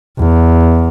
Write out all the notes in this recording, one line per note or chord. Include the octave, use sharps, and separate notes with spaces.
E2